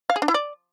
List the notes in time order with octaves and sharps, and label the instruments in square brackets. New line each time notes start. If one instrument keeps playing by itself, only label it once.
[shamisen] F5
G#4
D4
E4
D5